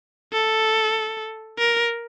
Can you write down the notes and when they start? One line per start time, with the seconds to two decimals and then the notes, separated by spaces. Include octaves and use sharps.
0.33 A4
1.59 A#4